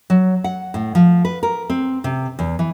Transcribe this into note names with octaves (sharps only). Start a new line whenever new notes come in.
F#3
F#5
A2
F3
B4
A#4
C4
C3
E2
E3